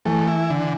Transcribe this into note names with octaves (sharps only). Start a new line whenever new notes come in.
E3 A3
E4
D3